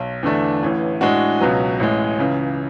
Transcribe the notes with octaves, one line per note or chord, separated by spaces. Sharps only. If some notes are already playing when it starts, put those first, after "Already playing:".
Already playing: B1
E2 D3 A3 D4
A1 A2 E3
A2 G#3 D4 F#4
C#2 B2 F#3 B3
A1 A2 G#3
C#2 C#3 E3